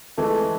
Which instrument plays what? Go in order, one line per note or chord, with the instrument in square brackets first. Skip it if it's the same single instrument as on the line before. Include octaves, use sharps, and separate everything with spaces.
[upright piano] E3 G#3 [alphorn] A3